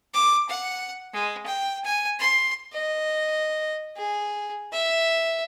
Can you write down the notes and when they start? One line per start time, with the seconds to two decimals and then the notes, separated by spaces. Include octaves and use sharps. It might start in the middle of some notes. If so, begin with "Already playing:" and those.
0.14 D6
0.49 F#5
1.13 G#3
1.46 G5
1.84 G#5
2.20 C6
2.73 D#5
3.96 G#4
4.72 E5